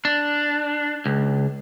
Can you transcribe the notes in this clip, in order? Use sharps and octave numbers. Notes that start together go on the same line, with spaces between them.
D4
C#2